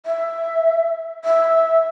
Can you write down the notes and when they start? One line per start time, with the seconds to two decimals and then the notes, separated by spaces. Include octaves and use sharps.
0.06 E5
1.25 E5